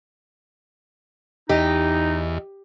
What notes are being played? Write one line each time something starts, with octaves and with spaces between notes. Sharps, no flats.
E2 D#4 G4 D#5